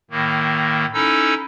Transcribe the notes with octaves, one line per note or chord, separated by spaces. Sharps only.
A2 D#3 A#3
C#4 D#4 E4 A4 E6